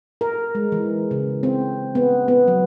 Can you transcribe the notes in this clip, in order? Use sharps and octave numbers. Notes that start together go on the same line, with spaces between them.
A#4
G#3
E3
C#3
C4
B3
B3
F#3